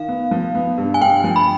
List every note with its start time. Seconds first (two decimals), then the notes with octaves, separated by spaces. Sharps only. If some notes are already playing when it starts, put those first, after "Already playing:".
Already playing: D#3 F5
0.09 B3
0.31 F3
0.55 B3
0.78 G2
0.94 G#5
1.01 G2 G5
1.24 F3
1.36 B5